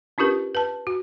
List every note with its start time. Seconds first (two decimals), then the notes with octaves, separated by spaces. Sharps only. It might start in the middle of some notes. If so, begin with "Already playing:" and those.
0.18 C#4 D4 F4 G4 A#4 B4
0.55 B4 A5
0.87 F#4